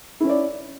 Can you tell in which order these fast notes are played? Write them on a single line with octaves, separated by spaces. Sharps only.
E4 C#4 C#5 D5